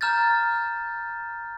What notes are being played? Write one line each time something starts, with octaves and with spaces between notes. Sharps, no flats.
A#5 F6 G6 A6